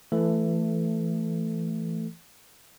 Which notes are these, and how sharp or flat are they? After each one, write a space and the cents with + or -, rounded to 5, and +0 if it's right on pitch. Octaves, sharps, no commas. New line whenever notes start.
E3 +25 A3 +10 A4 +5